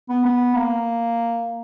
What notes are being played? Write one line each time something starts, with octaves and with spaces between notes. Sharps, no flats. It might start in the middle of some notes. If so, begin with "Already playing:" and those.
B3
B3
A#3